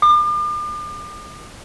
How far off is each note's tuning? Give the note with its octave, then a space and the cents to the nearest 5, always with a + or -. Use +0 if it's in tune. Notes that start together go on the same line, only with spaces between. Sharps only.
D6 +40